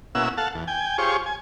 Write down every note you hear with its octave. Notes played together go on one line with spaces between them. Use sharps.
B2 A#3 C#4 E4 F#5 E6
A4 F5 F#5 A5
E2
G5 G#5
F4 G4 G#4 C5 C#5 C#6
G#5